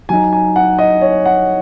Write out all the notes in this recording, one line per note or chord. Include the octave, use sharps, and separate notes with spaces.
F#3 D#4 G#5
G#5
F#5
D#5
C#5
F#5